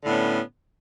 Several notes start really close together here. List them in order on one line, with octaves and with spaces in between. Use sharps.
D3 A2 B3 C#4